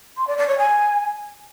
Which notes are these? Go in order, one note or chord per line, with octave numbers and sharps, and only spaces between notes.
C6
D5
D5
C#5
G#5